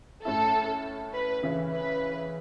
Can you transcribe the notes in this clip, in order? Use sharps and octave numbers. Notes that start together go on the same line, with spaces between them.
A2 A3 C#4 E4 A4
B4
C#3 E3 C#4 E4
B4